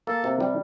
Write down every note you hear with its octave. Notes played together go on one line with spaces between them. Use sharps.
A#3 A4
C3
G3